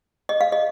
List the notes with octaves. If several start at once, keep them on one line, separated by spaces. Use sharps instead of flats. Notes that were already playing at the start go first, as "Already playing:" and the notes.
D#5
F5
D#5